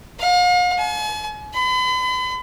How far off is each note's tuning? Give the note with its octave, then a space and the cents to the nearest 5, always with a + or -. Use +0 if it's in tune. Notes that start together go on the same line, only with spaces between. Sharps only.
F5 +40
G#5 +45
B5 +40